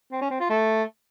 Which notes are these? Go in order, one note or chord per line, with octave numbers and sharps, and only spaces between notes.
C4
C#4
C4
F4
A3